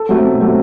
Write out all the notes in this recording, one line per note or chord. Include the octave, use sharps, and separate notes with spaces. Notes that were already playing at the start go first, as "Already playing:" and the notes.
Already playing: A4
F#3 A3 C4
B2
F#3 A3 C4